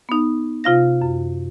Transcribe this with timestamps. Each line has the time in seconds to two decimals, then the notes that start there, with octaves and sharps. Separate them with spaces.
0.09 B3 D#4
0.64 C3 F4 F5 A#6
1.02 F#2